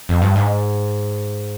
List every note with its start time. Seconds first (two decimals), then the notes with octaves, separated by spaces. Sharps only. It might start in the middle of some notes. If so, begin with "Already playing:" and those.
0.09 F2
0.22 G2
0.36 G#2